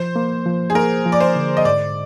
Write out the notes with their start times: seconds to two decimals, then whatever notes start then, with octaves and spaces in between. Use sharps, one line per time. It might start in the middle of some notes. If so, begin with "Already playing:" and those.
Already playing: F3 C5
0.16 A#3
0.46 F3
0.70 G#4
0.75 A#3 A#4
1.06 F3
1.12 D5
1.20 C5
1.36 D3
1.57 D#5
1.65 G#2 D5